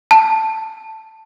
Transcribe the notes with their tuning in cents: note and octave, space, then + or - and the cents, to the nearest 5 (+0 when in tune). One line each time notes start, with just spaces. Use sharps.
A5 +5